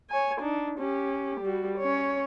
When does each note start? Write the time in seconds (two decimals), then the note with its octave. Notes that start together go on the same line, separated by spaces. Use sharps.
0.10 C#5 G#5
0.41 D4 D#4
0.79 C#4 G4
1.41 G3 F#4
1.79 C#4 C#5